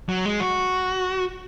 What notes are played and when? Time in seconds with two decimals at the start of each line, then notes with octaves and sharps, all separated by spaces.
0.09 F#3
0.25 G#3
0.40 F#4